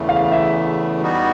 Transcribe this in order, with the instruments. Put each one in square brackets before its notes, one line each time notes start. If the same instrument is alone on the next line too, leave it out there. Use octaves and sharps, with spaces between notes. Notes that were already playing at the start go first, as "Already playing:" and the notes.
Already playing: [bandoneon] E2 C#3 E3 A3
[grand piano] F5
E5
[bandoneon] G3 B3 D#4 F#4